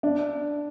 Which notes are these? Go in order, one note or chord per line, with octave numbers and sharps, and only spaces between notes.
D4